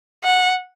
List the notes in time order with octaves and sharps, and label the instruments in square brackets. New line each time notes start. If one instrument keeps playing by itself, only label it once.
[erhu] F#5